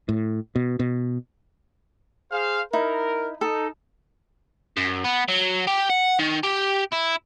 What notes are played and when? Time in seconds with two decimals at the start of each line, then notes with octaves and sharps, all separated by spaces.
0.09 A2
0.56 B2
0.79 B2
2.32 G#4 C5 F5
2.73 D#4 E4 A#4
3.41 D#4 A4
4.77 F#2
5.05 B3
5.29 F#3
5.67 G4
5.89 F#5
6.19 D#3
6.43 G4
6.93 E4